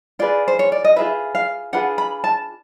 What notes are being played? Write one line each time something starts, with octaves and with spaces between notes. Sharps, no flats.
F4 G#4 B4 D5
C5
C#5
D5
D#5
F4 G#4 B4 E5
F5
D4 F4 G#4 B4 F#5
B5
A5